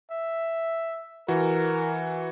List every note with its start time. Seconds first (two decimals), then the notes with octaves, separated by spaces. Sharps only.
0.11 E5
1.28 E3 F#4 A#4